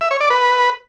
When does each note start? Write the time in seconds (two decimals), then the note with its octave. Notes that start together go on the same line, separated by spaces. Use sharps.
0.01 E5
0.11 C#5
0.20 D5
0.30 B4